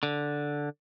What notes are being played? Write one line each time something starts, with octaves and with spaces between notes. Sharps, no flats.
D3